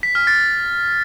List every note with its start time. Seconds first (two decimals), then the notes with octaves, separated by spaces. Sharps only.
0.03 B6
0.15 F6
0.27 A6